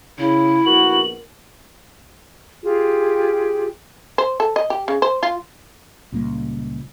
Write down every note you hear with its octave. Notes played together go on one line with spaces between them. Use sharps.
C#3 E4
A#1 B3 F#4 A#4 F#7
F4 G4 G#4
C5
A4
D#5
G4
C#3
C5
F4
C#2 A#2 G3 A#3